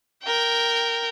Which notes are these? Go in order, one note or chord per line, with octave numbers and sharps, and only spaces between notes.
A#4 G5